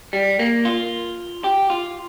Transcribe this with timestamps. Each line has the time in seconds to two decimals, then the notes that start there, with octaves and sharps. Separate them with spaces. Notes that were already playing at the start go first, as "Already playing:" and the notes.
0.13 G3
0.39 A#3
0.65 F4
1.44 G4
1.70 F4